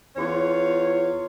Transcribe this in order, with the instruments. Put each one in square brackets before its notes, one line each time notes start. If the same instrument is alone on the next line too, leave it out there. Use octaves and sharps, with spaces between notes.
[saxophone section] E2 F4 C#5